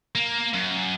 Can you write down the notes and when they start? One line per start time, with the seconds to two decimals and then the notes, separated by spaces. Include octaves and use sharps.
0.15 A#3
0.54 F#2